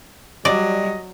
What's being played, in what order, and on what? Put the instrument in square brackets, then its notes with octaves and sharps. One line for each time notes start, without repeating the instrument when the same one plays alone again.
[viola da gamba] F#3 [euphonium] G3 [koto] D5 [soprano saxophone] D#5